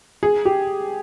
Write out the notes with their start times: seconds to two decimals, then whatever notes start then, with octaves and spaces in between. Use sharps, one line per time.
0.23 G#4
0.45 G4